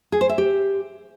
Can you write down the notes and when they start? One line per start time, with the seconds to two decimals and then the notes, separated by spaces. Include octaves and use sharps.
0.12 G#4
0.21 C5
0.29 E5
0.38 G4